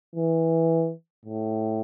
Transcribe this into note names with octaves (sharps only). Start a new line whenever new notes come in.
E3
A2